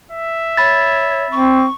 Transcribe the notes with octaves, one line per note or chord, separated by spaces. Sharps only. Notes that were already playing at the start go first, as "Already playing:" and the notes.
E5
C#5 B5 A6
C4 C#6